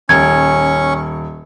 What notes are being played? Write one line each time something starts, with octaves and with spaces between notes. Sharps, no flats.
D#1 C#4 C#6 G#6